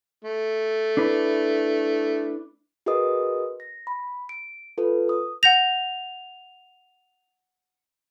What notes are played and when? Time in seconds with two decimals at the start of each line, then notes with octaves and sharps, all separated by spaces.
0.24 A3
0.97 D4 E4 B4
2.86 F#4 G#4 A#4 B4 D#5 D#6
3.60 A#6
3.87 B5
4.29 D7
4.78 F4 A4 B4
5.09 D#6
5.43 F#5 G6 A#6 F7